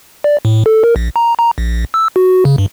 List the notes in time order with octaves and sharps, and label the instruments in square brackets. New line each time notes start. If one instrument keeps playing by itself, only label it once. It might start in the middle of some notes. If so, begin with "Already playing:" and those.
[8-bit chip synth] D5
A2
A4
A#4
A#1
A#5
A#5
A#1
E6
F#4
C#3
G2